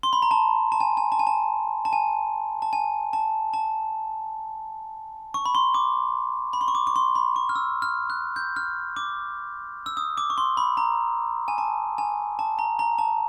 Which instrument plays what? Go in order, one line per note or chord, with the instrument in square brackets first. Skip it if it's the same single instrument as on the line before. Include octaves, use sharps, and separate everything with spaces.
[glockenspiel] C6
B5
A#5
A5
A5
G#5
G#5
A5
G#5
A5
A5
G#5
A5
G#5
A5
A5
C#6
B5
C6
D6
B5
C6
C#6
D6
C#6
C6
B5
C#6
F6
E6
F6
F#6
G6
F6
D6
E6
D#6
D6
C#6
C6
B5
A#5
G#5
A5
G#5
A5
A#5
A#5
A5